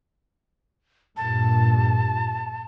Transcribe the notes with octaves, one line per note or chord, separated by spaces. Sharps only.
G2 A#2 A5